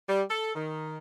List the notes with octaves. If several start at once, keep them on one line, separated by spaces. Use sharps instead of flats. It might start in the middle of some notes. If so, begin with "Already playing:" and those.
G3
A4
D#3